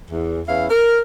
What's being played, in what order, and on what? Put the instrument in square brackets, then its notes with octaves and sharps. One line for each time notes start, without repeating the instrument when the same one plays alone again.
[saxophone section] E2
E2 B3 C#4 E4 F5
A#4